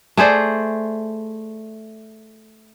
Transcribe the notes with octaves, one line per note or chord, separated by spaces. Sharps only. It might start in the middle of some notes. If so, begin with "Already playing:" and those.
A3 G#4 C5 D5